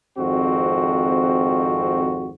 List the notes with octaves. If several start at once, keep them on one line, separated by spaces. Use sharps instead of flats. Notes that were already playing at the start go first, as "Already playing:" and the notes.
G#1 F2 C4 F#4